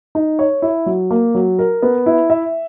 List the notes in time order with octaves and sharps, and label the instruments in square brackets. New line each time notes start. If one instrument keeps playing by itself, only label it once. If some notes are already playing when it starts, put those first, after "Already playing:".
[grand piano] D#4
C#5
E4
F#3
A#3
F#3
A#4
B3
E4
E5